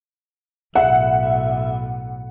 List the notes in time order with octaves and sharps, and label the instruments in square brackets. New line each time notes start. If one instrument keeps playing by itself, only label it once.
[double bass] B1 A2 [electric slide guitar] E5 [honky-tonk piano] F#5